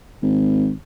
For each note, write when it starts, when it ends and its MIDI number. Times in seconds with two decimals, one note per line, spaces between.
0.22 0.73 32